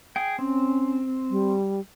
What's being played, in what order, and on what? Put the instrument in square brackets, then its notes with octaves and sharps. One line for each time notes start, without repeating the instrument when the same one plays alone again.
[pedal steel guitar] G#4 G5
[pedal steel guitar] C4 [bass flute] C#4
[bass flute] G3